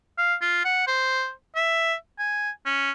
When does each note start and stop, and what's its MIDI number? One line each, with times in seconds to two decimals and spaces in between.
0.18 0.35 77
0.42 0.60 65
0.65 0.83 78
0.87 1.31 72
1.56 1.94 76
2.19 2.50 80
2.65 2.91 61